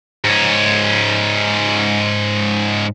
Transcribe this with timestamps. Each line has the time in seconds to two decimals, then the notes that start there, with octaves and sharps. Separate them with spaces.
0.24 G#2 C#4